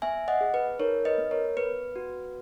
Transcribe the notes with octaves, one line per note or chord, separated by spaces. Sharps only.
B3 E5 G#5
D#5 F#5
G#4
B4
D#4 A#4 C#5
B4 D#5
B3
A#4 C#5
B3 B4
F#4